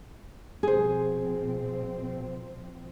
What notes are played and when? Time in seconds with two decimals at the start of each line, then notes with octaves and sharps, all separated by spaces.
0.63 B2 F3 C4 G#4 C5